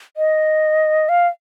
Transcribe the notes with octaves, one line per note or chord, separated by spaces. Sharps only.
D#5
F5